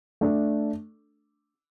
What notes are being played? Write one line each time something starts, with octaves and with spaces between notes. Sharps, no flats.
A3 D4 A4